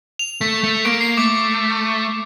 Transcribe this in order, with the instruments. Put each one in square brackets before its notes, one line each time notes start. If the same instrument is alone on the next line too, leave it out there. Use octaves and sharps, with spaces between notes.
[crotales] F7
[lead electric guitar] A3
A3
[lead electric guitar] A#3 [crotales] D7
[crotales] C7
[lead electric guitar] A3 [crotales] D6